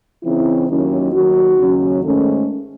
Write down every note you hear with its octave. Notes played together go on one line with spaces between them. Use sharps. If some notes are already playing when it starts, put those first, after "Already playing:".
C#3 E3 C4 D#4 E4
D#2 D#3 F#3 C#4 E4
D#2 D#3 F#3 F#4
D#2 C#3 F#3 C#4
G#2 D#3 A3 C#4 A4